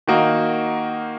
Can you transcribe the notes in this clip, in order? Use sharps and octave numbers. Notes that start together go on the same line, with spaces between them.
D#3 A#3 D#4 F#4